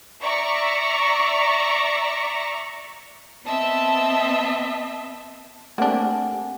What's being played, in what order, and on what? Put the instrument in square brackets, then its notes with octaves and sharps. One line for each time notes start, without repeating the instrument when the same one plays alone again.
[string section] D5 E5 A#5 C#6
[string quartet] B3 C4 D#5 E5 A5
[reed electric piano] A3 C4 G4 [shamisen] A#3 D4 [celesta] F#5 G#5